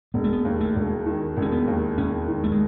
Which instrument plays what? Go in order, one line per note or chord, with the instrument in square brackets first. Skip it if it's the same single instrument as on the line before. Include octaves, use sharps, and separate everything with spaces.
[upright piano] E1 [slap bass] B3
[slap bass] A3
B3
[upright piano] D#2
[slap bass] A3
[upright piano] E1
D#3
E1
[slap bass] C#4
B3
[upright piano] D#2
[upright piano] E1 [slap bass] C#4
[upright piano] D#3
[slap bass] A3
G#3